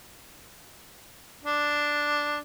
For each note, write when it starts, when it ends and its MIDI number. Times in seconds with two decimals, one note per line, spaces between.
1.44 2.40 62